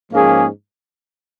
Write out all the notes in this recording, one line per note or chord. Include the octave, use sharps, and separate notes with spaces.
G#2 F3 A#3 C#4 G#4